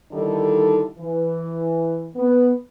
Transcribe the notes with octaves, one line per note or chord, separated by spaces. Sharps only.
D3 D#3 G3 D#4 E4 A4
E3
B3